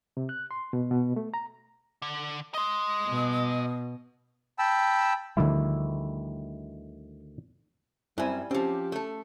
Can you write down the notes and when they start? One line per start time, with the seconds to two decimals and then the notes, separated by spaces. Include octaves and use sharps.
0.17 C3
0.29 F#6
0.51 C6
0.73 B2
0.91 B2
1.16 A3
1.34 A#5
2.02 D3
2.54 D#5 C6 D#6
3.07 B2
4.59 G5 A5 B5 E6
5.37 D2 D3 D#3 F3 G3 E4
8.18 F#2 G3 C4 E4 G#5
8.51 F3 C4 C#4 G4
8.92 A3 A4